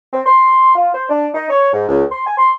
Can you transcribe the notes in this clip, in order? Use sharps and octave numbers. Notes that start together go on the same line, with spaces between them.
C4
C6
F4
C5
D4
D#4
C#5
G#2
C#2
C6
G#5
C6